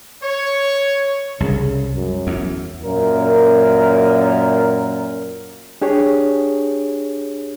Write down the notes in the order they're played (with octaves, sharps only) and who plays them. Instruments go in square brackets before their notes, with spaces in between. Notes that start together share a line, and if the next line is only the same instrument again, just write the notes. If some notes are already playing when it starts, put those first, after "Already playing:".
[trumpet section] C#5
[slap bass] C2 [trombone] C#3
[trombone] F#2
[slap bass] E2
[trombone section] F#2 A#2 A#4
[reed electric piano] D4 G4 G#4 C#5